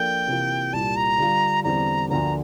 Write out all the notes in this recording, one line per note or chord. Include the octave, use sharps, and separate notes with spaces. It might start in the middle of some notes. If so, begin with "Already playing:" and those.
Already playing: F3 A#3 D4 A4 G5
C3 E3 A#3 F4
C2 A#2 G3 A5
A#5
D3 G3 D4 F4
E2 D3 G3 C4 A#5
D2 D3 F3 A#3 D4 A#5